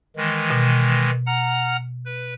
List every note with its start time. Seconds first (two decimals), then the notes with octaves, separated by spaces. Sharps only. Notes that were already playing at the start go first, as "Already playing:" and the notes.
0.16 D#3 E3 G#3
0.50 B2
1.26 F#5 A#5 F6
2.05 B4